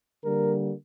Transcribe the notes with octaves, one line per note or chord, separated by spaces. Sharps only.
D3 G3 A#3 A#4